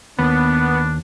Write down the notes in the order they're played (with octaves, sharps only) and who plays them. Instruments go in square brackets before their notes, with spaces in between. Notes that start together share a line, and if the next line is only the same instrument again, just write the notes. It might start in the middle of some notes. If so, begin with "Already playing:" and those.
[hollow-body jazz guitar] D#2 [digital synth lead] B3 [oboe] D4